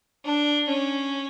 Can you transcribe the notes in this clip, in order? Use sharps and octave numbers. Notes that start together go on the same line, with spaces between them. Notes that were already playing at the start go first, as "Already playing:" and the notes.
D4
C#4